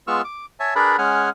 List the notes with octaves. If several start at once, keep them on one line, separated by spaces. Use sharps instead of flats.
G#3 B3 F4 C#6 E6 F6
D6
C#5 E5 G#5 A5
D4 G#4 A#4 B4 D5 B5
G#3 C#4 F#5 G#5 F6